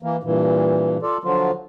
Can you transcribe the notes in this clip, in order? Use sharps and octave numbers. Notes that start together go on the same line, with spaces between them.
E3 A#3
G2 A#2 E3
F4 A4 D5
D3 F3 F#3 F4